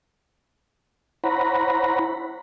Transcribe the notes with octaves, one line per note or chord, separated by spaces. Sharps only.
E4 C5 C#5 F#5 A#5 B5